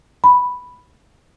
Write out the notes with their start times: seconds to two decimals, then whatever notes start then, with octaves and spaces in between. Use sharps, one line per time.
0.24 B5